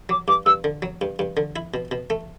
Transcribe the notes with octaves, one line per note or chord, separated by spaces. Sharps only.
F#3 D6
G2 D6
G2 E6
D3
F#3
G2
G2
D3
E4
B2
B2
A3